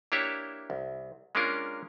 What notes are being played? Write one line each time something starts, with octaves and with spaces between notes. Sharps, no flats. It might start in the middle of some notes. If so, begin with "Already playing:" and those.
A#3 D4 E4 G4 C#5 E5
C2
G#3 A#3 C#4 D4 F4 A#4